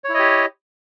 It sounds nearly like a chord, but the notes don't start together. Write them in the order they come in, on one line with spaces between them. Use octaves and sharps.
C#5 E4 D#5 G4